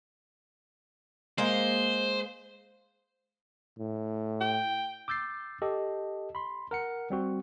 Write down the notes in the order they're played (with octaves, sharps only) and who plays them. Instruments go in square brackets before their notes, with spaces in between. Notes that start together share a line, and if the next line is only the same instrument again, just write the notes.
[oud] G#3 A#3 [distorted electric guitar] C5
[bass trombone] A2
[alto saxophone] G5
[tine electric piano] D6 E6 G6 A6 C7
G4 A4 D#5
B5 C6
A#4 F#5 C#7
G3 C4 F#4